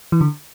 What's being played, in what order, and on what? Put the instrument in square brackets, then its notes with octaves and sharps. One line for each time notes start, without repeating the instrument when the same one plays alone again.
[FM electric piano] E3
D3